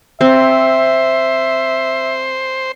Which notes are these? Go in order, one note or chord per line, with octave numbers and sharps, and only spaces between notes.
C4 C5 E5